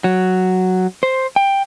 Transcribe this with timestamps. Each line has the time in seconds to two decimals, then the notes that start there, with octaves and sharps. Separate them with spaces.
0.04 F#3
1.03 C5
1.36 G5